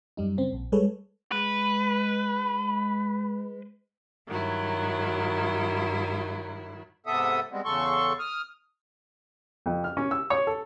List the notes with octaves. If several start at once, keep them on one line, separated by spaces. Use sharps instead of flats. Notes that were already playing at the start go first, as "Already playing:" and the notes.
F#2 G3 D#4
C#3 C4
A#1
G3 G#3 G#4 A4 B4 C#5
G#3 B4
G2 D#3 F#3 E4
G#2 C3 B3 A4 E5 D#6
G3 G#3 B3 C4
E2 C#3 A4 C6 C#6
D#6 F6
F2
F6
C#4
E6
C#5
A4